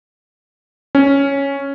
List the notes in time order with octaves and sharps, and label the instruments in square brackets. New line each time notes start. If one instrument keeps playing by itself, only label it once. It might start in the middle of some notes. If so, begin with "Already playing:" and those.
[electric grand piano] C#4